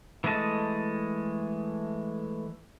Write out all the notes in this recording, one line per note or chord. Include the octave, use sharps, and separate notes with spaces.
E3 G#3 A3 D#5 A5